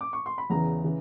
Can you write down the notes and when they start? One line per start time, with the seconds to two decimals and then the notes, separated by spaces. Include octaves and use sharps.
0.01 D6
0.13 C#6
0.26 C6
0.38 B5
0.50 E2 C#3 E3 A#5
0.84 C#3 E3